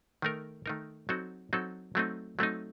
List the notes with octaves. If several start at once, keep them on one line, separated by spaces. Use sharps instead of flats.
D#3 A3 D#4 A#4
D#3 A3 D#4 A#4
F#3 C4 D#4 F#4 A4
F#3 C4 D#4 F#4 A4
F#3 A3 C4 D#4
F#3 A3 C4 D#4